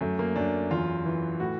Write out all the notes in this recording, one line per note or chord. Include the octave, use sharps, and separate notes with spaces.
F#2 A3
A#3
F#2 D4
E2 F4
E3
A2 F#4